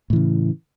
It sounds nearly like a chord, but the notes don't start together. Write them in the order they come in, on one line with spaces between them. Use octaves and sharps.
A2 E3 C#3